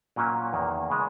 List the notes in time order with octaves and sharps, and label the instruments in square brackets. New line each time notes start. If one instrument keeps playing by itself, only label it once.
[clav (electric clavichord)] A#2 F#3 A#3 C#4
E2 D#3 A#3
C#3 G#3